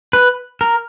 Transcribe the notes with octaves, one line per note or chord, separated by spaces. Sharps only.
B4
A#4